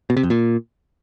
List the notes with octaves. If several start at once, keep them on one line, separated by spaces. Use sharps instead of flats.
B2
C3
F2
A#2